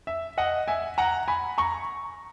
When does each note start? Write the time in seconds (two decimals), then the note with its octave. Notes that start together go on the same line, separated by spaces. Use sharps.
0.07 E5
0.38 D#5 F#5
0.68 E5 G#5
0.98 F#5 A#5
1.28 G#5 B5
1.58 A#5 C#6